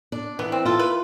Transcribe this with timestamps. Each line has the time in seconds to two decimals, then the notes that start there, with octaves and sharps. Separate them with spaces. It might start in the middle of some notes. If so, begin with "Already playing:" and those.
0.12 D4
0.39 E3 B3
0.52 C4
0.65 F4 A4
0.79 B4